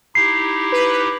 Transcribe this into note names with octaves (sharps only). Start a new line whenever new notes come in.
D#4 E4 G4 C7
B4